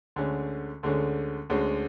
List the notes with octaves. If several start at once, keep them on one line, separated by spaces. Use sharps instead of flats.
D2 D3 G#3 C#4
D2 D3 G#3 C#4
D2 D3 G#3 C#4